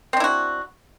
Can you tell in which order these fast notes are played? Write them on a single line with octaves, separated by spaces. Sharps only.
C4 D4 E4 F#4